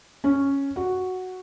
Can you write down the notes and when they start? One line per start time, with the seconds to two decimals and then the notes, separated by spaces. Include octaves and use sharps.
0.24 C#4
0.76 F#4